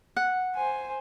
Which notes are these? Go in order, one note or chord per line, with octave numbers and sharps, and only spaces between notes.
F#5
C5 G#5